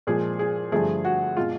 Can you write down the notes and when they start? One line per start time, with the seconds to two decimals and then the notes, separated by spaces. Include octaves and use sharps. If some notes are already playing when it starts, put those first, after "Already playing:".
0.07 A#2 F3 G#3 G#4
0.39 G#4
0.72 G2 D3 F3 A3 G#4
1.05 F#4
1.37 B2 G#3 F4